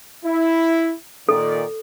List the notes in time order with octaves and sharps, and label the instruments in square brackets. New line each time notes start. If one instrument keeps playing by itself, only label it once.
[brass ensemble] E4
[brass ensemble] A#2 D#3 D5 [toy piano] A4